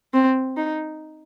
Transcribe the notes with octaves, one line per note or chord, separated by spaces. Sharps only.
C4
D#4